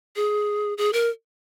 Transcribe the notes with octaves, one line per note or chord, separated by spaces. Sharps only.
G#4
G#4
A#4